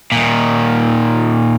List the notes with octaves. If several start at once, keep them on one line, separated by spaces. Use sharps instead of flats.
A#2 D#3